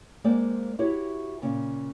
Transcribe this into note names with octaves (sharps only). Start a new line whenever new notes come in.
G#3 A#3 C4 C5 D5
E4 F#4 G4 C#5
A#2 C#3